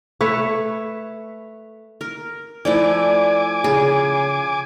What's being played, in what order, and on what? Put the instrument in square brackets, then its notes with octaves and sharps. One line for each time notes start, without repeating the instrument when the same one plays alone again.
[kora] A3 B4 C#5
[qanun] A#4
[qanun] F3 A3 E4 [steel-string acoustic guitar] D5 [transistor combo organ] G#5 D6
[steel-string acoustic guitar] C#3 [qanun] G#4